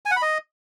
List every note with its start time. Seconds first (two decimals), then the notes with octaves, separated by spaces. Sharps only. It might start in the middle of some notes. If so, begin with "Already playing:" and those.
0.06 G#5
0.11 F#5
0.16 B5
0.22 D#5